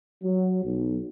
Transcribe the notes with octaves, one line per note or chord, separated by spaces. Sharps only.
F#3
B1